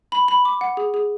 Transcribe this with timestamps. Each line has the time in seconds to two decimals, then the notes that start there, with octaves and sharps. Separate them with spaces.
0.12 B5
0.28 B5
0.45 D6
0.61 F#5
0.77 G#4
0.94 G#4